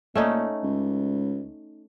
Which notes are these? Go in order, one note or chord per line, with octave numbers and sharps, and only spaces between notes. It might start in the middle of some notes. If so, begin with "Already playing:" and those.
A#2 A3 C#4 D#4
C#2